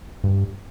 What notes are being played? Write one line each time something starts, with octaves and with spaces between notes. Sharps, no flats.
G2